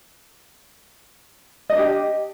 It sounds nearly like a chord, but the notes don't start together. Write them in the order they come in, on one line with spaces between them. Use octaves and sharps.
D#5 D#4 D4 G4